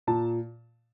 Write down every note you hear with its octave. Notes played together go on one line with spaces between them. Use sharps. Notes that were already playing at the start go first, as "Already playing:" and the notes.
A#2 A5